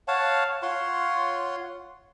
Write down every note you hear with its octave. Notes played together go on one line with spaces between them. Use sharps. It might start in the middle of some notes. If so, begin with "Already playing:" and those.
C#5 F5 F#5 A5
F4 C#5 F#5 C6